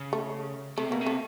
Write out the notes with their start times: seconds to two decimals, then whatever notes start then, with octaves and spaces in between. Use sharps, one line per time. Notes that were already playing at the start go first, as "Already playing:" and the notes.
Already playing: C#3
0.13 A3
0.78 C3 A3
0.90 B2 A#3
1.01 C3
1.06 A3